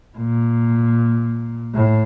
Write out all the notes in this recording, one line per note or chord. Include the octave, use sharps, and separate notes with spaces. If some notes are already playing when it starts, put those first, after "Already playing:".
A#2
A2